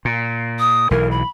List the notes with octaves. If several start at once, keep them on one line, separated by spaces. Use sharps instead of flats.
A#2
D#6
B1 E3 A#4
B5